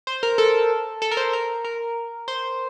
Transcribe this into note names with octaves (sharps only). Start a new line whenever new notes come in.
C5
A#4
A4
A4
A#4
C5
A#4
A#4
C5